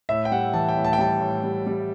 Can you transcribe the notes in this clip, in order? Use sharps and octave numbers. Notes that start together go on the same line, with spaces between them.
A2 E5
G5
G3 F#5
E3 A5
G5
A2
A5
G5
G3 A5
A2
G3
G3